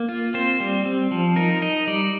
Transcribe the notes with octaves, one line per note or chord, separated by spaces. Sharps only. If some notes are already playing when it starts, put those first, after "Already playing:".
Already playing: A#3
F4
C4 C5
G3
C4
F3
D#4 A#4
D#4 D#5
G3 D5